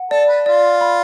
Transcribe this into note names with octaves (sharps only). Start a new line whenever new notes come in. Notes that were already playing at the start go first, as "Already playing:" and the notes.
Already playing: F#5
A4 D5
B4
F4 D5
B5